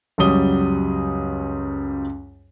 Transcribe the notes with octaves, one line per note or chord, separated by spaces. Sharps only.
C#2 F#2 F#3 G3 D#6 G7